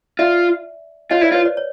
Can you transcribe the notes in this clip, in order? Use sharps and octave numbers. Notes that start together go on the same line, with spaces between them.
F4 D5 E5
F4 C#5 D#5
E4 C5 D5
F4 B4 C#5
C5 D5
C#5